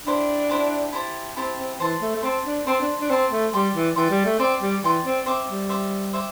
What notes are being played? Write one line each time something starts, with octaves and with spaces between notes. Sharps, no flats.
D4 E4 G4 C5 A5
E4 G4 C5 A5
E4 G4 C5 A5
C4 E4 G4 C5 A5
C4
E3 C5 A5 C6
A3
A3
C4 C5 A5 C6
D4
C4 C5 A5 C6
D4
D4
C4 C5 A5 C6
A3
G3 D5 G5 C6
E3
E3 D5 G5 C6
G3
A3
C4 D5 G5 C6
G3
E3 D5 G5 C6
C4
C4 C5 E5 G5 D6
G3
C5 E5 G5 D6
C5 E5 G5 D6